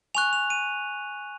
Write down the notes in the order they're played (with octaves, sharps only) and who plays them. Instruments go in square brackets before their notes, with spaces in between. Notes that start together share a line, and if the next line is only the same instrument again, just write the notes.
[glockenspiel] G#5 C#6 F#6 F7
F7
D#7